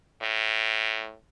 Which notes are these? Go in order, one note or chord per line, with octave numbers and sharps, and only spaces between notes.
A2